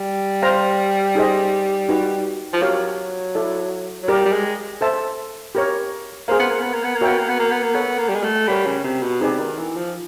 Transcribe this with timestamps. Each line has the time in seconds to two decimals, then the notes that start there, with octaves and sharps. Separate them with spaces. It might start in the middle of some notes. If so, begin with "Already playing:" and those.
Already playing: G3
0.42 C5 F5 A#5
1.15 D#4 G#4 C5 D#5
1.89 D#4 F#4 B4
2.53 F3
2.62 F#3 G4 A#4 C#5 F5
3.35 E4 A4 D5
4.03 F#3
4.08 G3 G4 A#4 D5
4.25 G3
4.32 G#3
4.81 A4 C5 E5 A5
5.55 G4 A#4 C#5
6.28 A#3 G#4 C5 F5
6.39 B3
6.50 A#3
6.62 B3
6.73 A#3
6.84 B3
6.95 A#3
7.01 B3 F#4 A#4 C#5 E5 G5
7.18 A#3
7.29 B3
7.39 A#3
7.51 B3
7.62 A#3
7.74 B3 A4 C#5 F#5
7.99 A#3
8.08 G3
8.15 G#3
8.23 A3
8.48 G3 A#4 C#5 F#5 B5
8.66 C#3
8.84 C3
9.02 B2
9.21 C3 D#4 G#4 B4 D5
9.39 D#3
9.58 E3
9.76 F3